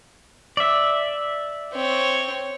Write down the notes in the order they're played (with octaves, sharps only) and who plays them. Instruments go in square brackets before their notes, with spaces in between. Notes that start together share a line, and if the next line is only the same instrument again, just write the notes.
[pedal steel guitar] D5 E5
[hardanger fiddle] C4 C#5